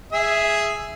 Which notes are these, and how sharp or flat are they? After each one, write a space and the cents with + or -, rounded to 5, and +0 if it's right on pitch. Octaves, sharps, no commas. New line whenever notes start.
G#4 +0 E5 +0